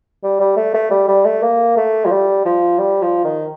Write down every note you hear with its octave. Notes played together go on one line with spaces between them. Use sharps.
G3
G3
A3
A3
G3
G3
A3
A#3
A3
F3
G3
F3
G3
F3
D#3